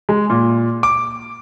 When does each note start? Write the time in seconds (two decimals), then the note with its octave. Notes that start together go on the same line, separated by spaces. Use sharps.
0.09 G#3
0.30 A#2
0.83 D6